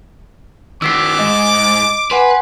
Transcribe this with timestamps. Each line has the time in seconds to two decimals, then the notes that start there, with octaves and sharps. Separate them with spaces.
0.82 D#3 F#4 D6 E6 B6 C7
1.19 G#2 D#5
2.11 B4 F#5 G#5 C6